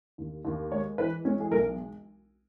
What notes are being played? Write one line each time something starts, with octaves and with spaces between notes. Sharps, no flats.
D#2
D#2
G#3 C#5
E3 B4
G#3 C#4
G#4
B1 A#4